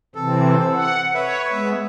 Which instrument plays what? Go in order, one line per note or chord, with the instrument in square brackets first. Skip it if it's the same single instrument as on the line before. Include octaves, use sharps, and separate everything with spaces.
[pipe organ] C3 E3 C4 [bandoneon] A4
[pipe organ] F#5
[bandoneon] B4 E5 [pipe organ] C#5
[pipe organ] G#3 B3